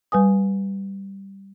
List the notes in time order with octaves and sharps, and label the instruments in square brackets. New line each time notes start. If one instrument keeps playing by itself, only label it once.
[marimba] G3 B4 G#5 D#6